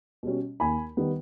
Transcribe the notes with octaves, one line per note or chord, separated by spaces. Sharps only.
B2 G3 C#4
D#2 G#5 B5
D#3 G3 B3